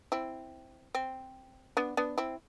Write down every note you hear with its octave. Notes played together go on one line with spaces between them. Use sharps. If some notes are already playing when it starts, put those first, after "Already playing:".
C4 E4
C4
B3 D4
B3 D4
C4 E4